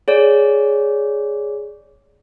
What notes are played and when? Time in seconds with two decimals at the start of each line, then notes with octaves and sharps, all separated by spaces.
0.08 G#4 C#5 D5